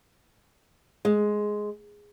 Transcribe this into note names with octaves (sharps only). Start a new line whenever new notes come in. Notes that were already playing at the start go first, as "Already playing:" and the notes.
G#3